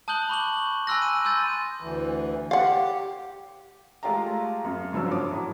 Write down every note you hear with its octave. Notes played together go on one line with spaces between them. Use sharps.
A5 D#6 F#6 G6 F#7 G7
B5 C#6 D6 F#7
G#5 B5 C6 E6 F#6 A#6
D#7
C6 E6 G6 A6 D#7
D2 E3
G4 F5 F#5
G#3 A3 F4 G4 F5 A#5
F#2 F#3
F#1 G2 C#3 F3 F#3 E6
F#4 C#5 D6 D#6
A2 F#3